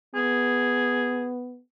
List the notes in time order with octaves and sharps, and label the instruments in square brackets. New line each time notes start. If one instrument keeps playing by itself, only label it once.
[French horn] B3 [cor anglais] G#4